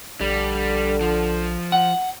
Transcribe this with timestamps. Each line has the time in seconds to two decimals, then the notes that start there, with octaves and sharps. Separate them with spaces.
0.21 A#1 D3 G3
1.01 F3
1.72 F#5